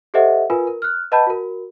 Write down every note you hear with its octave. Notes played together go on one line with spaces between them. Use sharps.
G4 A4 C5 D#5 E5 F#5
F4 A#4 B4 G#5
A#4
F6 F#6
B4 D#5 F#5 A5 B5 G6
F#4 A#4